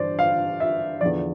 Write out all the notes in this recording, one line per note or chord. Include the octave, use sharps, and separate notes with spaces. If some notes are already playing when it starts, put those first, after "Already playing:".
Already playing: G2 E3 C5 D5
F5
E5
E2 D3 F3 D5